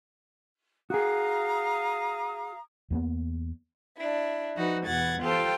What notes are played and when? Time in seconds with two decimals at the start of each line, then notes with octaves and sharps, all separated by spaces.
0.90 F#4 G#4 F5 A#5 D#6
2.90 E2 A#3 B3
3.97 D4 E4
4.55 F3 D#4 F#4 B4
4.86 E2 B2 F#5 G#6 A6
5.22 F4 G4 A4 C5 G5